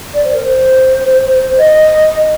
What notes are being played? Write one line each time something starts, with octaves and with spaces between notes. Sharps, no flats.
D5
C5
A#4
C5
D#5